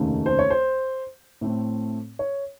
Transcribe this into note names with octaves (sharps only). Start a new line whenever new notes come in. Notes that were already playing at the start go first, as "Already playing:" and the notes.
Already playing: F1 D#2 C#3 A3 D#4
C5
C#5
C5
A2 A3 C4
C#5